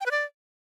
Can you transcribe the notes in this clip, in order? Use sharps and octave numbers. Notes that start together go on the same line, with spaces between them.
G5
B4
D5